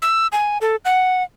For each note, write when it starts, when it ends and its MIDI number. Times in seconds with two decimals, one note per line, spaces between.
0.02 0.27 88
0.32 0.58 80
0.61 0.76 69
0.85 1.23 78